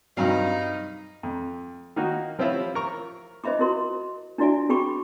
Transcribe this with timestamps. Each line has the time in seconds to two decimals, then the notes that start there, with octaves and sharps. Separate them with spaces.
0.17 G2 C3 F#3 D#4 F5
1.23 F2
1.96 D#3 A#3 D#4 F#4
2.39 F3 C4 C#4 E4 F4 G4
2.75 F4 A#4 C#6
3.44 C5 D#5 E5 B5 D6
3.59 E4 F#4 A#4 C6
4.38 D4 E4 F#4 D5 E5 G#5
4.69 F#4 G#4 G5 B5 C#6 D6